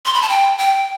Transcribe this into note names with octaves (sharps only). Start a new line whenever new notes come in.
C6
B5
A5
G5
G5